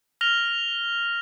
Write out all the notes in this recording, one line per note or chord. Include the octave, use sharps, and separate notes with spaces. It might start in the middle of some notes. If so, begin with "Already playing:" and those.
F6 A#6 F7 G7